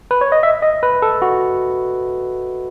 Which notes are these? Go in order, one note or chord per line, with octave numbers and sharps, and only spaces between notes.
B4
C#5
D#5
E5
D#5
B4
A4
F#4